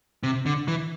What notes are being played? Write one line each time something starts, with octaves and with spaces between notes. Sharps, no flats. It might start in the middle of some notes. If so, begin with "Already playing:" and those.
C3
D3
E3